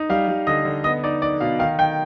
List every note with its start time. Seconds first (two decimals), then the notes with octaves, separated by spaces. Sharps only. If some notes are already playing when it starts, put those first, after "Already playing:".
Already playing: D#4
0.09 G3 F5
0.28 G3
0.47 D3 D#5
0.65 D3
0.84 B3 D#5
1.03 D#4 D5
1.22 D#4 D5
1.40 B2 F5
1.59 D#3 F5
1.78 D#3 G5